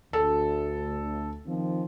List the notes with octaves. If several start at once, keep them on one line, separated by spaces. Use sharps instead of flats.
D2 A4
D#3 F3 C4